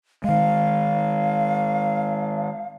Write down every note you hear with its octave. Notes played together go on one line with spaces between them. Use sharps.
D#3 G#3 F5